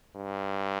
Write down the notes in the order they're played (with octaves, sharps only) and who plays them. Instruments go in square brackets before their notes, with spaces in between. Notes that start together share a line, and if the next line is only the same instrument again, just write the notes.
[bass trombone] G2